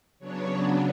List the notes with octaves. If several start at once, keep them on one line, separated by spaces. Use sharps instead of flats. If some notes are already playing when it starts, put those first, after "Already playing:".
C#3 F#3 B3 D4 C#5